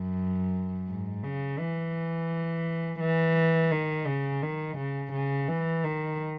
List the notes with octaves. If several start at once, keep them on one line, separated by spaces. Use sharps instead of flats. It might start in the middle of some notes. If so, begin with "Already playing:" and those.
Already playing: F#2
G#2
C#3
E3
E3
D#3
C#3
D#3
C#3
C#3
E3
D#3